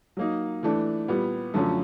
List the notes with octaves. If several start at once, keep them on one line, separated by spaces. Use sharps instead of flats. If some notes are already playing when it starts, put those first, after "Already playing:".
F#3 A#3 D#4
E3 A3 D4
A#2 G3 B3
F#2 D3 F3 A3 C#4